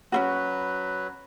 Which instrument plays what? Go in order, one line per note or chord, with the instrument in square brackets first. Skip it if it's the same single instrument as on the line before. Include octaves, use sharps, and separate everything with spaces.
[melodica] F#3 B4 [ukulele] C#4 F4 F#4